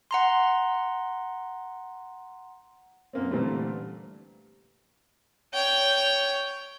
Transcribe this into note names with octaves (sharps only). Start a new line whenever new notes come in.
F#5 A#5 C6
F#2 A#3 C4
A#2 D3 E3 G3 A3 C4
C#5 G5